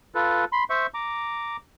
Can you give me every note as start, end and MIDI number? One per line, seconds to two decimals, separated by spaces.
0.15 0.45 65
0.15 0.45 69
0.15 0.45 71
0.52 0.64 83
0.52 0.64 84
0.70 0.87 72
0.70 0.87 76
0.70 0.87 85
0.94 1.57 82
0.94 1.57 86